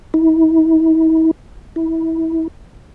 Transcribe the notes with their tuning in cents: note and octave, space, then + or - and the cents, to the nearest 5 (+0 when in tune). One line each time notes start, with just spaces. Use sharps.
E4 -45
E4 -25